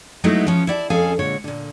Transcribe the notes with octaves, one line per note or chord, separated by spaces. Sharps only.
F#3 G#3 A3 B3 D#4 E4
F3 B3 C#4
E4 D5 F#5 A5
F2 C#4 G#4 A4 F5 G#5
A#2 D3 G#3 C#5
A#2 D3